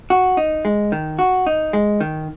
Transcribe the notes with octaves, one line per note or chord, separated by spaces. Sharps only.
F#4
D#4
G#3
D#3
F#4
D#4
G#3
D#3